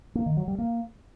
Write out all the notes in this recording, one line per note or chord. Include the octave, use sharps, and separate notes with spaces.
A#3
D#3
F#3
G3
A#3